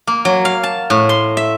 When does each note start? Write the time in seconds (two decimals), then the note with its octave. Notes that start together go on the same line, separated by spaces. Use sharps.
0.07 A#3
0.25 F#3
0.45 F5
0.63 A5
0.90 A2
1.09 C6
1.37 E5